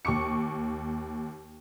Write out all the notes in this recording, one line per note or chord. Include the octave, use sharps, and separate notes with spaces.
D#2 C#6 D6 C#7